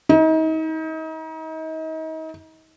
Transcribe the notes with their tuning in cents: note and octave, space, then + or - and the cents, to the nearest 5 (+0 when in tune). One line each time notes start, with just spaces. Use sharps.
D#4 +35